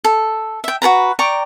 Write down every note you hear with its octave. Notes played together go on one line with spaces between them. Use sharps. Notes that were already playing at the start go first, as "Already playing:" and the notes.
A4
E5 G5
F#4 A4 B4 A#5
D5 G5 A#5 C#6